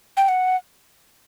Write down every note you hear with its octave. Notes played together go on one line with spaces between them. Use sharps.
G5
F#5